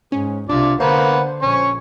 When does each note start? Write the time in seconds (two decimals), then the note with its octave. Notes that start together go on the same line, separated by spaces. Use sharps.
0.12 G#2 C#4
0.49 C2 C3 D4 F4 D5
0.80 D3 A#3 B4 C5 F#5
1.42 A#1 C#4 C#6